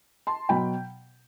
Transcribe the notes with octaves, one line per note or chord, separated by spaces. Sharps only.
A5 C6
B2 F#3 G5 B5